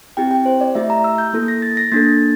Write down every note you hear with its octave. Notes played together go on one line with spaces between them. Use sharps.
C4 E4 G4 G5
G5
C5
D5
A3 E4 G4 E5
A#5
E6
G6
A#3 E4 A4
A#6
A6
A#6
A#3 D4 A4 A6